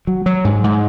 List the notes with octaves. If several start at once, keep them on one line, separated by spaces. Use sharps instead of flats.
F#3
F#3
G#2
G#2